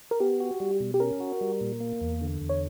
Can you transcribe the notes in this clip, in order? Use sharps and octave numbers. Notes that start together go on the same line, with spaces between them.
A#4
B3 G4
F#4
G3
B2
G4
C#4 A#4
F#4
G3
A#2
A#3
E2
D3
E2
C#5